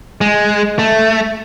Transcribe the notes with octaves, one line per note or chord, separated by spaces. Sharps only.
G#3
A3